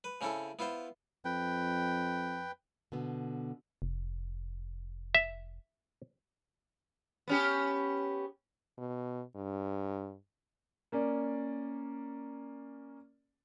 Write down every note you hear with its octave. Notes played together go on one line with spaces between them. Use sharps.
B4
C#3 C4 C#4 E4 A4
B3 E4 F4 C5
F2 B4 G5
B2 D3 B3
F1
E5
B3 C#4 G4
B2
G2
A#3 C#4 D5